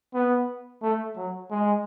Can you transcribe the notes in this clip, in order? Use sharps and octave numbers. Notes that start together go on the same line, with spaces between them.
B3
A3
F#3
G#3